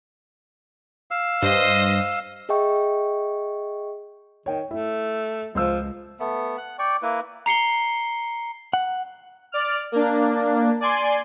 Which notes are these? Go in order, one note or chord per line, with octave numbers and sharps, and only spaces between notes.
F5 E6
G2 C5 D#5
G#4 D#5 E5 G5 C#6
D#3 C#5 G5
A3 E4
C#2 F3 C5 E6
A3 B3
F#5
D5 G5 C#6
A#3 E4 B4
A#5 C7 C#7 G7
F#5
D5 F6
A#3 D4
D5 G#5 C6